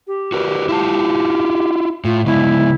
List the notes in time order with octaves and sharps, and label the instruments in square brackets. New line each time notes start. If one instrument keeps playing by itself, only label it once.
[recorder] G4
[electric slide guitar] F#4 A#4 B4
E4 F4 A5
[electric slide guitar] A2 [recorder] F4
[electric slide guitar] C#3 G#3 B3 [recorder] E4